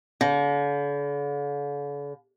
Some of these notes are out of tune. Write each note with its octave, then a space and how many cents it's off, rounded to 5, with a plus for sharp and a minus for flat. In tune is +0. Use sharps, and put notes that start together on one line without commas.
D3 -45